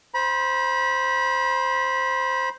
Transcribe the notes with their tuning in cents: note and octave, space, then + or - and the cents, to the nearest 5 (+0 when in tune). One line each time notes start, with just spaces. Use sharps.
C5 +0 B5 -35